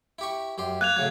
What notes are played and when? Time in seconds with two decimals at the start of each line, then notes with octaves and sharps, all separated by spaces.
0.19 E4 G4 C#6
0.58 F#2 G4 C6
0.81 A#3 F#6 G#6 F7
0.96 A2 C#3 F#3 G#6